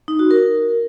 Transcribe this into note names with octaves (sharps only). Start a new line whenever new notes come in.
D#4
F#4
A#4